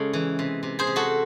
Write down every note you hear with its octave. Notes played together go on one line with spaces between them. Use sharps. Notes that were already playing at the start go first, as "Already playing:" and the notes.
Already playing: C#3 G#3 A4
E3
C3
C3
G#4 C5
C3
F#4 A4